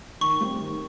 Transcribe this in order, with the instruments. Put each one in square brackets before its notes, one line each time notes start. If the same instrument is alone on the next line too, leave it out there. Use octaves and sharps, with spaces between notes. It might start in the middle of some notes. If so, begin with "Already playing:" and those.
[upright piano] D#3 [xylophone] C#6
[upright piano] G3 C4
D#3